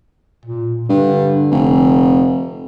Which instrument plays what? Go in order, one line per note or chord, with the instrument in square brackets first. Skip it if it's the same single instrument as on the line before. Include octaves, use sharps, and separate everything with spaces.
[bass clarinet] A#2
[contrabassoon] G2 [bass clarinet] D3
[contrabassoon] F1